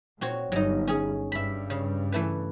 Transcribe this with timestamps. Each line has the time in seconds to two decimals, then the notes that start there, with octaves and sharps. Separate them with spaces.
0.21 A#2 C4 F#4 C#5
0.52 G1 F#3 D#4
0.87 C#4 G#4
1.32 G2 E5 B5
1.70 C#3
2.12 E3 A3 B4